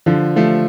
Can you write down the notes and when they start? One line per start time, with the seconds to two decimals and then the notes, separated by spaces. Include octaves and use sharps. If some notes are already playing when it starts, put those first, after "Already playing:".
0.06 D3 F3
0.36 F3 A3